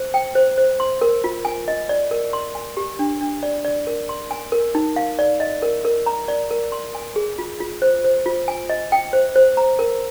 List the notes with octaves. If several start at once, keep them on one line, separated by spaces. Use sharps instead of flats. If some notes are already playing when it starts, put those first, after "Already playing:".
Already playing: C5
G5
C5
C5
C6
A#4
F4
G#5
D#5
D5
A#4
C6
G#5
G4
D4
D4
D5
D5
A#4
C6
G#5
A#4
D#4
F5
D5
D#5
A#4
A#4
A#5
D5
A#4
C6
G#5
G#4
F4
F4
C5
C5
F4
G#5
D#5
G5
C5
C5
A#5
A#4